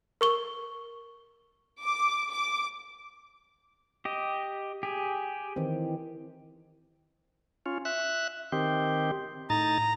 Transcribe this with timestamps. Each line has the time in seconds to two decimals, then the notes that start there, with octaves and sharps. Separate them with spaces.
0.21 A#4 C#6 G7
1.84 D6
2.30 D6
4.05 G4 D#5
4.83 G4 G#4
5.56 D#3 E3 C4
7.66 C#4 F4
7.85 E5 F#6
8.52 D#3 C4 G4
9.50 A2 D#4 A#5 A6